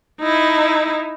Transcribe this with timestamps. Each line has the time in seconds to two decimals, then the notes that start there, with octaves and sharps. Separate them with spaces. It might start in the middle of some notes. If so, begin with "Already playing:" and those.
0.20 D#4 E4